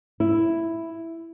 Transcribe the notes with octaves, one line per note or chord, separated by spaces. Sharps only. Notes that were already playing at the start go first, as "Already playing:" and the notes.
E4